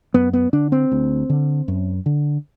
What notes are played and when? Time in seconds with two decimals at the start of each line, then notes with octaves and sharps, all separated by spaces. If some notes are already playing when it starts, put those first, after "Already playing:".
0.14 F#2 B3
0.33 B3
0.53 D3 D4
0.72 C4
0.92 D2
1.30 D3
1.68 F#2
2.06 D3